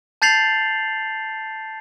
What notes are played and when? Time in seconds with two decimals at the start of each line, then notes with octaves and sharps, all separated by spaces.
0.22 A5 G6 A6 C7 F7 F#7